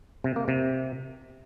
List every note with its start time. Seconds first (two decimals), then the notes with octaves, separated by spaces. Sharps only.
0.24 C3
0.36 A#3
0.48 C3